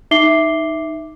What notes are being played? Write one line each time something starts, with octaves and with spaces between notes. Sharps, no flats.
D#4 E5 D6 C7 G7